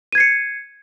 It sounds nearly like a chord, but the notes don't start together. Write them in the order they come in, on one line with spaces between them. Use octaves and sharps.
D#7 G#6 C7 C#7